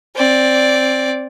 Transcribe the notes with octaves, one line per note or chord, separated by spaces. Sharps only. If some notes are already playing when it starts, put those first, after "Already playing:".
C4 D5